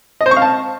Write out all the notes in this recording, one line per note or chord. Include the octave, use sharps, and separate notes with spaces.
D#5
C5
C#6
F5
A5